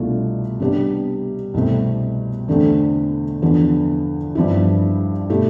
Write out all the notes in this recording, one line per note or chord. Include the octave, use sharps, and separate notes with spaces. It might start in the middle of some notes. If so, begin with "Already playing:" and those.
Already playing: C2 B2 A3 D4 F4
C3 G3 B3 D4
C2 B2 A3 C4
E2 D3 A3 C4
E2 D3 F3 B3
G2 F3 C4 E4
B2 A3 E4 G4